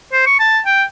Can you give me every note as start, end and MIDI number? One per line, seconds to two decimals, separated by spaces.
0.13 0.22 72
0.26 0.38 85
0.40 0.60 81
0.66 0.83 79